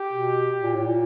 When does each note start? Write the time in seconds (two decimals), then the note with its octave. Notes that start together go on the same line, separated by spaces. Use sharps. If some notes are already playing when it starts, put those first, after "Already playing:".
Already playing: G4
0.13 B2
0.63 A#2
0.74 A2
0.87 A#2